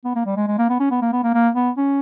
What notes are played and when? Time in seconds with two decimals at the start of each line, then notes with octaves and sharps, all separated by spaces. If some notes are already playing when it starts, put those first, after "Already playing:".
0.05 B3
0.15 A#3
0.26 G3
0.36 G#3
0.48 G#3
0.58 A#3
0.69 B3
0.80 C#4
0.91 B3
1.02 A#3
1.12 B3
1.23 A#3
1.34 A#3
1.55 B3
1.77 C#4